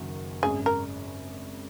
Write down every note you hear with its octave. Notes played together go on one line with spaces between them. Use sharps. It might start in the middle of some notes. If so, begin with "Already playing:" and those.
Already playing: F#1 F#2 D#3 F#3 A#3
G#1 F#2 C#3 G#4
A#4